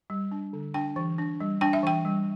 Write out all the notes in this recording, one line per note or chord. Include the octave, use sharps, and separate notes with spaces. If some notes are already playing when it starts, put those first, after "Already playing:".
G3
D4
D3
D4 G5
E3
D4
G3
D4 G5
E5
E3 G5
G3